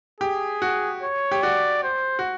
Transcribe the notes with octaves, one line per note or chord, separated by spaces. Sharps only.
G4 G#4
F#4
C#5
G4
F#4 D5
C5
F#4